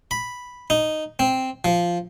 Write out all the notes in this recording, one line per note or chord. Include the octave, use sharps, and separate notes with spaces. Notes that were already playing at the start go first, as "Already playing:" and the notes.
B5
D#4
C4
F3